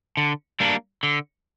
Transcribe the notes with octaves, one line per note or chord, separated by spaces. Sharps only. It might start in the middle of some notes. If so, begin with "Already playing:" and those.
D3
G3 A#3 D4
D3